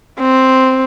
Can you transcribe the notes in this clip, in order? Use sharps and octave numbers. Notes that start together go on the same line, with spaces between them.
C4